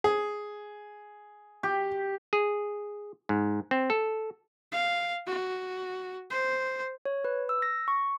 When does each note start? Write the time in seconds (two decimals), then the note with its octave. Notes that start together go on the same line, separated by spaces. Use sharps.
0.04 G#4
1.63 G4
2.33 G#4
3.29 G#2
3.71 C4
3.90 A4
4.72 F5
5.27 F#4
6.30 C5
7.05 C#5
7.24 B4
7.49 E6
7.62 A#6
7.88 C#6